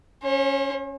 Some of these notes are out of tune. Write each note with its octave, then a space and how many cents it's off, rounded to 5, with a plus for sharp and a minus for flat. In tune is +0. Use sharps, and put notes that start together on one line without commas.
C#4 +0 C#5 -45